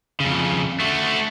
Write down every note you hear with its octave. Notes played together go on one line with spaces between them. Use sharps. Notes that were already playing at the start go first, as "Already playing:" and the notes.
F2 C#3
A3 F#4